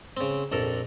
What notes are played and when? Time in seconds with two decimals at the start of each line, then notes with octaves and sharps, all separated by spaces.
0.17 C#3 C4
0.52 A#1 F2 A4 A#4